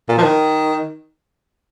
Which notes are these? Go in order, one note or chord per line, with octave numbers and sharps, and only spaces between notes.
A#2
F3
D#3